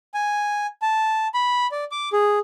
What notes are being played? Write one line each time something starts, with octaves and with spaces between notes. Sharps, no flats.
G#5
A5
B5
D5
D6
G#4